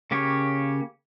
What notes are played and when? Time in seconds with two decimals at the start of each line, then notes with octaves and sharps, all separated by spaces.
0.11 C#3 A#3 G4 C#5